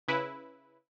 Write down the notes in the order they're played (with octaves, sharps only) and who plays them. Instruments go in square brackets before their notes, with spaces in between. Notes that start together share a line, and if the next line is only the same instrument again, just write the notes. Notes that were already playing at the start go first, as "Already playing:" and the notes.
[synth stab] C#3 E4 B4